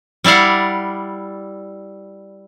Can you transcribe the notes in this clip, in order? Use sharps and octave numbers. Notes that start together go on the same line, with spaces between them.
G3 E4 D5 F5 F#5